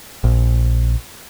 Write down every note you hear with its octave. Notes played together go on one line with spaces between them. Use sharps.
A#1